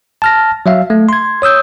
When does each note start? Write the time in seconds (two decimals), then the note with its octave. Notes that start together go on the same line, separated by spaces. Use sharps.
0.22 A5 F6 A#6
0.66 F#3 E5 F5
0.90 A3
1.09 C6 G#6
1.42 C#5 D#6 E6 G6